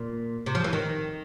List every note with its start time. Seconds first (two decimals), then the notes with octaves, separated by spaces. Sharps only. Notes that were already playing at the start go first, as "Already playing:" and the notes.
Already playing: A#2
0.46 C3
0.55 F3
0.64 E3
0.73 D#3